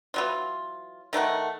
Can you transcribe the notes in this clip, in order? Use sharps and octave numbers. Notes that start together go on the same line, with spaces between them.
E3 F#3 F4
D#3 A3 A#4 F#5